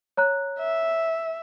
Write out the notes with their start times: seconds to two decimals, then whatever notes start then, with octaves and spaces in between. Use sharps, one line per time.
0.17 C#5 A#5 F#6
0.59 E5